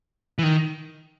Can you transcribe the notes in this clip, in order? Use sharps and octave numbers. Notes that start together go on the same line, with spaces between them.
E3
D#3